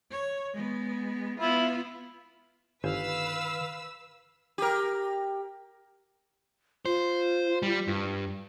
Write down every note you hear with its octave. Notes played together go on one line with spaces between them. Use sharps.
C#5
G#3 B3
B3 E4 F4
G1 D#3 B4 C5 F5 G#5 E6
G4 A#4
F4 C5
G3
G2